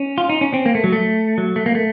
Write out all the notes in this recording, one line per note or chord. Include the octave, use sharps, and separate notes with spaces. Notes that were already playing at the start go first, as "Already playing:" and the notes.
Already playing: C#4
F4
D#4
C#4
C4
A#3
A3
F#3
A3
F#3
A3
A#3
A3